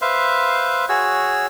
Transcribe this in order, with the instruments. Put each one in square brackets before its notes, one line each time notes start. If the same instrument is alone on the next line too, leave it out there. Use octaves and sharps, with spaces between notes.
[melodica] B4 C5 E5 F5
F#4 G#4 C#5 E6